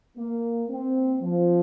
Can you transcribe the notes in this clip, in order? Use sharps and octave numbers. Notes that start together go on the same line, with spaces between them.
A#3
C4
F3